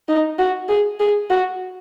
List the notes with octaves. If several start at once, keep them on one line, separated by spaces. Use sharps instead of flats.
D#4
F#4
G#4
G#4
F#4